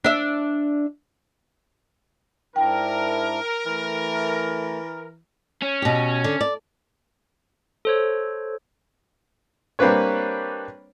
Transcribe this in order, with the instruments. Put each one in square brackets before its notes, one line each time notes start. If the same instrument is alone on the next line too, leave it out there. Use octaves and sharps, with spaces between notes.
[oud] D4 E5
[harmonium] G#2 D4 E4 [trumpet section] A#4 [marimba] G5
[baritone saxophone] E3 [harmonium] A3
[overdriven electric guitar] C#4
[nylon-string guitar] B2 G4
D3
D5
[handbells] A4 C5 C#5
[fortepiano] G3 A#3 C4 D4 B4 C#5